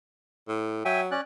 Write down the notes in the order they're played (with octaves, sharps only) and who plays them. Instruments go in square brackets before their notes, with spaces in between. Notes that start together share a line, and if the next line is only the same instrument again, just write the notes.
[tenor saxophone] A2
[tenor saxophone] F#3 [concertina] E5 G5 G#5
[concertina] C#4 D5 F#6